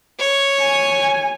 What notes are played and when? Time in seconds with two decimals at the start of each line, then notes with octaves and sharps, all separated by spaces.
0.19 C#5
0.61 G#5